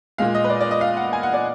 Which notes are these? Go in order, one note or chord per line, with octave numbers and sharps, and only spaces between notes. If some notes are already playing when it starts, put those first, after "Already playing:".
A#2 G#3 F5
D#5
B4
D5
D5
D#5
F5
F#5
G#5
F#5
D5